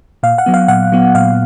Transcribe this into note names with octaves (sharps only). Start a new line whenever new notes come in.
A#2 F5
F#5
F#3 B3
F5
A#2 F#5
F#3 B3
A#2 F5